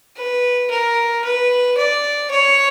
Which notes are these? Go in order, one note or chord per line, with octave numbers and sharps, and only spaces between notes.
B4
A#4
B4
D5
C#5